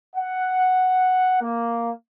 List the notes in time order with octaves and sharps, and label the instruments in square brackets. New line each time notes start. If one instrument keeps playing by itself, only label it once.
[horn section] F#5
A#3